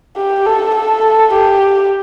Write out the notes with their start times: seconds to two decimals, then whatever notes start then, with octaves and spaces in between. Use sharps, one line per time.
0.17 G4
0.46 A4
0.75 A4
1.34 G4